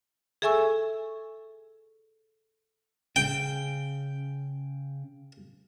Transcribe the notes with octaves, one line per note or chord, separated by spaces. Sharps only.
G#4 A4 E5 G#5 C#6 E6
C#3 G5